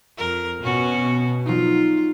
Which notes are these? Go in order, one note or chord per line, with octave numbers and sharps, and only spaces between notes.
F2 A#4
B2 B3 C#4 F#4
F#3 D#4 F4